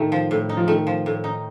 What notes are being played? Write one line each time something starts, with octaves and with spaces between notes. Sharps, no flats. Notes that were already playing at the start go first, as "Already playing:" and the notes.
Already playing: A2 D#3 A3
F3
A2
D#4
F3
D#3 A3
F3
A2
D#4